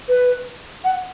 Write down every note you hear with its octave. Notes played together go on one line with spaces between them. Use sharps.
B4
F#5